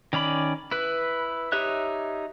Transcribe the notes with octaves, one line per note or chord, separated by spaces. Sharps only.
D#3 C#4 D5 B5
E4 B4
D#4 G4 C#5 E5 F#6